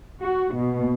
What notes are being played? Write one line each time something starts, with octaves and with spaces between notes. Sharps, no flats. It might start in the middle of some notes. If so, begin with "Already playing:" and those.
F#4
B2